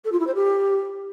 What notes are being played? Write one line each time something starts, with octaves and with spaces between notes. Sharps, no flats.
A4
F4
E4
C5
G4